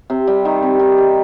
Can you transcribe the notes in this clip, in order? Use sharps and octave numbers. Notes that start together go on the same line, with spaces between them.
C3
G3
D#3
C3
D#3
G3